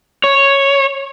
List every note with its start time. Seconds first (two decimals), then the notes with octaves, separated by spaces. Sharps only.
0.24 C#5